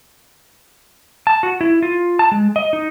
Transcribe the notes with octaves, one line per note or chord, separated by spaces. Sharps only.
A5
F#4
E4
F4
A5
G#3
D#5
D#4